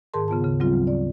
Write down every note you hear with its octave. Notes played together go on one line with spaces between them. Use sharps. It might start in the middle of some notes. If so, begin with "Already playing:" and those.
G#2 D#3 G#4 A#4 A5 C6
C#3 B3 F4 A5
D2 C#3
F#3 G3 C4 F4
D2
D5